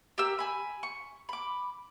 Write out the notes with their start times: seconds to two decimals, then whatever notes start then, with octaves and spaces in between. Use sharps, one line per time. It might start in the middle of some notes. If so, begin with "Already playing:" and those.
0.18 G4 A#4 E6
0.39 G#5 B5
0.83 C#6
1.29 B5 D6